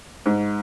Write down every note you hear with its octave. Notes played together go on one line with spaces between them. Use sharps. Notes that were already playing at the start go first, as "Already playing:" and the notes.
G#2